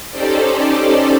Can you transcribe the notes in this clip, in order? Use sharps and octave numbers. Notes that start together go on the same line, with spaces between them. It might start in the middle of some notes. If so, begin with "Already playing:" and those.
C#4 D#4 G4 A4 C5 D5